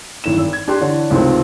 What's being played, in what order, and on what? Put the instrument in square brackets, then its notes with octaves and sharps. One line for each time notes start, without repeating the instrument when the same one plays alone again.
[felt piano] G#1 A2 E7
G#1 E6
G#6
D4 G4 C6 F#6
D3 E3 D4 C#5
C#2 C3 D#3 F3 A3 C4